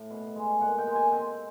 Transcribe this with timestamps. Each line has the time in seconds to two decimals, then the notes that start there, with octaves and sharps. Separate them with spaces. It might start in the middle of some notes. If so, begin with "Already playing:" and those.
Already playing: A2
0.11 B2
0.36 G#3
0.61 A#2 F#5
0.78 G5
0.87 G#3
0.95 G#5
1.12 C4 G5